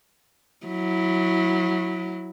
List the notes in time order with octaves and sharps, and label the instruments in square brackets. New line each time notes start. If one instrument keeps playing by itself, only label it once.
[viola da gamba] F#3 E4